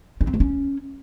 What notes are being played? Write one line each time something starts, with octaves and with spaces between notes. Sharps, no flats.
C#4
C4
A3
C#4